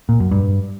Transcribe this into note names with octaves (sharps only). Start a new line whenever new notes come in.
A#2
F#2
G2